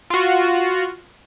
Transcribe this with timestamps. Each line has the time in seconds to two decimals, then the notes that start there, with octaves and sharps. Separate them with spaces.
0.10 F4 F#4